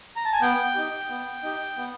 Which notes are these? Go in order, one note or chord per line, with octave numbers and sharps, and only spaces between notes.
A#5
A5
G#5
B3 G5
D#4 G4
B3
D#4 G4
B3